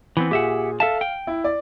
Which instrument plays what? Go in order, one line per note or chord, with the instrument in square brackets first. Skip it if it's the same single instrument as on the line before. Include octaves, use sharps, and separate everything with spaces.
[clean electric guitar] E3 B3 C4
[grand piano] A#2 G#4 [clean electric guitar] G4 E5 F#5
[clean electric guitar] A4 E5 A5 [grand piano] F5
[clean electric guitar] G5
[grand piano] E4
D5